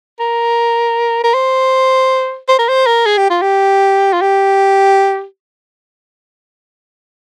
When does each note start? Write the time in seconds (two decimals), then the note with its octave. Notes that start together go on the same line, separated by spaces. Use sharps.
0.20 A#4
1.24 A#4
1.34 C5
2.48 C5
2.59 A#4
2.69 C5
2.87 A#4
3.06 G#4
3.18 G4
3.30 F4
3.42 G4
4.13 F4
4.21 G4